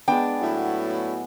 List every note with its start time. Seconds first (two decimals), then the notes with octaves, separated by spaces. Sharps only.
0.08 G#3 B3 D4 G5
0.41 A2 F#3 E4